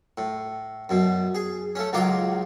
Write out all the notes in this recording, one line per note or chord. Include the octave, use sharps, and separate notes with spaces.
A2
F#2 B2
G#4
A3 C#4
C#2 D#3 F#3 F4 D6